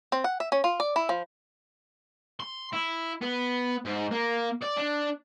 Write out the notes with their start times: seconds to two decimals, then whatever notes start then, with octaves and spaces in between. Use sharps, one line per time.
0.12 C4
0.24 F#5
0.40 E5
0.52 C#4
0.64 F4
0.80 D5
0.96 E4
1.09 F3
2.40 C6
2.73 E4
3.21 B3
3.85 G#2
4.11 A#3
4.62 D5
4.77 D4